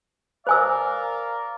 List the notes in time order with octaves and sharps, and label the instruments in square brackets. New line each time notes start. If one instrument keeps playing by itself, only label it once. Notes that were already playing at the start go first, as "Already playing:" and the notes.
[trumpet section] A#4 D5 F5 [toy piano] C5 G#5 E6